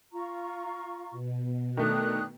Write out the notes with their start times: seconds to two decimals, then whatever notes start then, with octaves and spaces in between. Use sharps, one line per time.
0.13 F4 A#5 C#6
1.11 B2
1.77 D#3 A3 D4 D#6 F#6